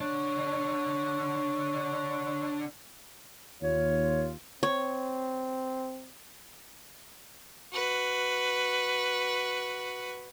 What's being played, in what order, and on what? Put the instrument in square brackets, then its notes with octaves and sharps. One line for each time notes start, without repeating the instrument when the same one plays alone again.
[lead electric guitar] D3 D4 [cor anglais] C#5
[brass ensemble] D#2 F4 [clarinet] C#5
[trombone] C4 [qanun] C#5
[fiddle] F#4 B4